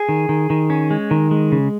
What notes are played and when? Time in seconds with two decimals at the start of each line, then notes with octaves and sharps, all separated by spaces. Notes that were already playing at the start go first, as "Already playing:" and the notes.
Already playing: G#4
0.09 D#3
0.29 D#3
0.50 D#3
0.70 C#4
0.91 G#3
1.11 D#3
1.31 G#3
1.52 C#3